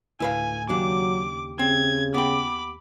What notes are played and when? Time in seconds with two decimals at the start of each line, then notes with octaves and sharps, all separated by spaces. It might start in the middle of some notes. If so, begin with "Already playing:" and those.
0.20 D2 A2 E4 B4 F5 G#5
0.69 D#2 C#3 F#3 D4 G4 D6
1.59 C#3 C4 G#6
2.14 B3 G5 B5 D6